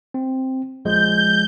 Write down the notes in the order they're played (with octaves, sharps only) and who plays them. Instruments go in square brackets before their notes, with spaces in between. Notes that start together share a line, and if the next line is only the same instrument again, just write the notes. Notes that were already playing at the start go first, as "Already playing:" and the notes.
[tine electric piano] C4
[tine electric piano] A#1 F3 G#3 [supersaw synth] G6